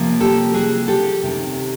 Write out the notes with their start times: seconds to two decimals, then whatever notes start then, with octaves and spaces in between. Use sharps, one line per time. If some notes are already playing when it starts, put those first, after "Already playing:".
Already playing: C3 F3 A#3 C#4
0.20 G4 A4
0.54 F#4 G#4
0.88 G4 A4
1.23 D2 C3 D#3 G#3 C#4